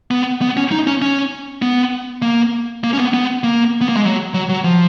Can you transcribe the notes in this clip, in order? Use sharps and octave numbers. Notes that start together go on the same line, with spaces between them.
B3
B3
C#4
D#4
C#4
C#4
B3
A#3
A#3
C#4
B3
B3
A#3
B3
A#3
G#3
F#3
F#3
F#3
F3